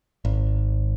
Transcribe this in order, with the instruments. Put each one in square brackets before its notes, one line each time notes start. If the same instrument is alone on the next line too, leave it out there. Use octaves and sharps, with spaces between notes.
[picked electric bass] G#1